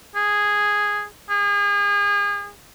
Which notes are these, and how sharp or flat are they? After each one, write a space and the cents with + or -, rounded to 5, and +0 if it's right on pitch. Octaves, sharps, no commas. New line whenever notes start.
G#4 -5
G#4 -35